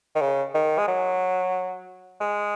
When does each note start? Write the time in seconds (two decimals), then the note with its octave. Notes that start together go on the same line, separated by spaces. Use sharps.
0.15 D#3
0.21 C#3
0.54 D#3
0.78 G#3
0.88 F#3
2.20 G#3